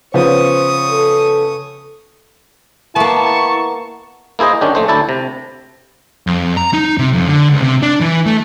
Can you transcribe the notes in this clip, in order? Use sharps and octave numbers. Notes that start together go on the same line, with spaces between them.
C#3 F3 B3 C5 C#6 D#6
A4
A#3 B3 E4 A5 C#6
A#3 E4 G#4 C5 D#5
D#3 C#4 D4 G4
A#1 A3 C5
D2 E4 A4 D5
C3
F2
A#5
D#4
C3
F2
D3
C#2
C3
D4
E3
A3